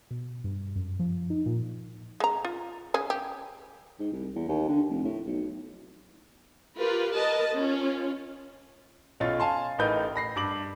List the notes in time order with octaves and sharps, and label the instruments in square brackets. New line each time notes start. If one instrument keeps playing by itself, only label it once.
[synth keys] B2
G2
F#2
F3
D#4
A#2
[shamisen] G#3 A#5
F4
C#3 G#4
G4
[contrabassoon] G#2
C2
E2
D#2
D3
F1
A2
B1
[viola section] F4 G4 A#4 B4
A#4 B4 D#5 A5
C#4 F4
[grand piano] B1 C#4 F4 A6
F5 G#5 A5 C6
A1 A2 D#4 A#4 B4 G6
B5 A#6 C7
G2 D6 F#7